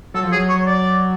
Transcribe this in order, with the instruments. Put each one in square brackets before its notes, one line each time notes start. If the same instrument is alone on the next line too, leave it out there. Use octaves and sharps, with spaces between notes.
[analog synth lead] F#3 [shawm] A4
[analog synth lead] F3
[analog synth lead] F#3 [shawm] G#4
[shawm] C#5
D5